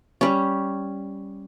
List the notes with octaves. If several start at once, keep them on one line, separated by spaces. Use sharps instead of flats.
G3 C#4